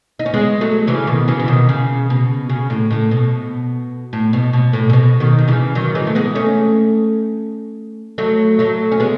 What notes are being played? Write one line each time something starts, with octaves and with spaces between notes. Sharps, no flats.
D#4
C#4
G#3 B3
F#3 A3
C#3 E3
B2 D#3
C#3 E3
E3
B2 D#3
C#3
B2
C#3
A2
A2
B2
A2
B2
B2
A2
C#3
B2
B2 D#3
D#3
C#3 E3
D#3 F#3
E3 G#3
A3
G#3 B3
A3 C#4
F#3 A3
F#3 A3
C#4
G#3 B3